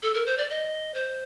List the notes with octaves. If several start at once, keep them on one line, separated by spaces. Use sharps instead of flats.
A4
A#4
C5
D5
D#5
C5